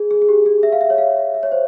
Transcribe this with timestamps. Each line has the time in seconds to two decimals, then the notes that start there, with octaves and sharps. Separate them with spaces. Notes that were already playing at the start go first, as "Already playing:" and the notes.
Already playing: G#4
0.11 G#4
0.22 G#4
0.29 G4
0.46 G#4
0.63 E5
0.72 F5
0.81 E5
0.90 C#5
0.98 F5
1.34 E5
1.43 C#5
1.52 C5